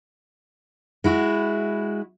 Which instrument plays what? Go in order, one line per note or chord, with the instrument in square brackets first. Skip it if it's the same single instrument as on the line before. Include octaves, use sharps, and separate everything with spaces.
[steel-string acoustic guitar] G#3 E4 F#4